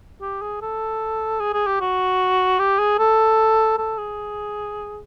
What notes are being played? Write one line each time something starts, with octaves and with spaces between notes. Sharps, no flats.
G4
G#4
A4
G#4
G#4
G4
F#4
G4
G#4
A4
A4
G#4